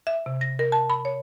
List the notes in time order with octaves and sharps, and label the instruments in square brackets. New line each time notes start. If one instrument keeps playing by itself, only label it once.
[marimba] E5
C3
A#6
A#4
A5
B5
C#5